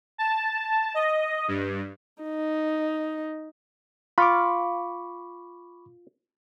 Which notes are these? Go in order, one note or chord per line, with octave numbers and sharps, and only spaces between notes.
A5
D#5
G2
D#4
F4 B5 C#6 D6